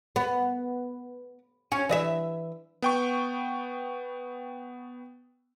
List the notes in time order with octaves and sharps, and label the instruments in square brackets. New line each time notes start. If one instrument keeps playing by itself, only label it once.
[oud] B3
C#4
E3 D#5 E5
[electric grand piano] B3 G5 C#6